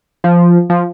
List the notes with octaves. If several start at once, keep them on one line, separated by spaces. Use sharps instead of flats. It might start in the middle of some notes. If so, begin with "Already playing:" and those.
F3
F3